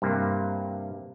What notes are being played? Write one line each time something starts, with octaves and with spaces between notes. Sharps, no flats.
G2 C3 A#3